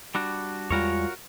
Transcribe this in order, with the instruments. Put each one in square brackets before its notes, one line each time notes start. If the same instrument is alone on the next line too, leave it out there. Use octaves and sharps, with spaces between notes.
[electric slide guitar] G3 D4 F#4
[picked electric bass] E2 G3 G#3 [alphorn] F4 [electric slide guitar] F#4 A#4 C#5